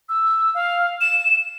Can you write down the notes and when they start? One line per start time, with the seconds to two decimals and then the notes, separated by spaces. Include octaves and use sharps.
0.09 E6
0.54 F5
1.01 E7